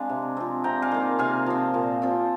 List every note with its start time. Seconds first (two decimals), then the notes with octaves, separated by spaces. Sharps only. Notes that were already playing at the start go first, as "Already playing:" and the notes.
Already playing: G#3 C4 D4 F5 G#5 A#5
0.09 C3
0.37 F3 C4
0.64 C3 G5 A#5
0.82 F5 G#5
0.91 D#3 A#3
1.19 C3 F5 G#5
1.46 F3 C4
1.74 A#2
2.02 F3 C4